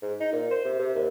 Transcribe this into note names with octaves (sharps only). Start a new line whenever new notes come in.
G#2
D#4
A#2
C5
C3
C3
D#2